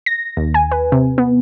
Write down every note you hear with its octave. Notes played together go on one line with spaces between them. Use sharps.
A#6
D#2
G#5
B4
C3
B3